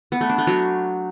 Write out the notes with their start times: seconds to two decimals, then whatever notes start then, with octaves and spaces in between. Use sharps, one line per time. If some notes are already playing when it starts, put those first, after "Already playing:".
0.12 B3
0.21 A3
0.30 D4
0.38 A3
0.47 F#3